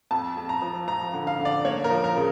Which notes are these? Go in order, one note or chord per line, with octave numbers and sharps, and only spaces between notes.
F2 A5
F2
A#5
F3
F3 A#5
D3
F5
D3
D5
A#3 C#5
A#4
F3
A#4
C#3